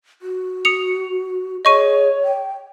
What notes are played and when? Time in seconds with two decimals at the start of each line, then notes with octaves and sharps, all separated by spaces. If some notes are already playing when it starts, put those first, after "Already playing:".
0.22 F#4
0.65 D#6 C#7 F7
1.65 G#4 C#5 D#5 C#6 D#7
2.24 G5